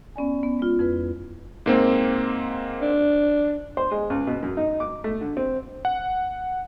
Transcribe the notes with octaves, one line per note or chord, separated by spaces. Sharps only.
B3 C#4 D5 G#5
B3
G#3 F4
F2 E4 B4
G#2 A#3 C4
D4
C5
G#3
C#2
B2
F#2
D#4
D6
A3
D3
C4
F#5